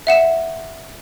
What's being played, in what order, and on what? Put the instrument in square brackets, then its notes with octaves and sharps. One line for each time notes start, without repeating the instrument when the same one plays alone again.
[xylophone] E5 F#5 E7